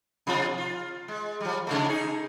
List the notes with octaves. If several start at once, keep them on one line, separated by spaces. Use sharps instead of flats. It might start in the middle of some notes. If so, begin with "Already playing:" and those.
B2 F3 F4
F4
G#3
F3 G3
C3 G#3 A3
D#4 G#4